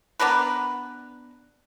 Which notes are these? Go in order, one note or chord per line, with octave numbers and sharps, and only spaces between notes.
B3 D4 A#4 B4